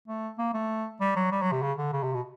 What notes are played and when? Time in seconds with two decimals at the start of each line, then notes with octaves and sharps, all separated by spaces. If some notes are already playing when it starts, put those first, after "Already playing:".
0.08 A3
0.39 A#3
0.54 A3
1.01 G3
1.16 F#3
1.32 G3
1.42 F#3
1.52 C3
1.62 C#3
1.78 D3
1.93 C#3
2.03 C3
2.14 B2